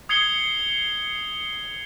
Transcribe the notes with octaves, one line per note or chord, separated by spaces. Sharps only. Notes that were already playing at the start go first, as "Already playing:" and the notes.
D#6 G#6 C7 C#7 G7